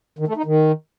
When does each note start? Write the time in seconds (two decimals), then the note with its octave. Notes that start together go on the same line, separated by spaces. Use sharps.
0.19 D#3
0.28 A3
0.37 D#4
0.46 D#3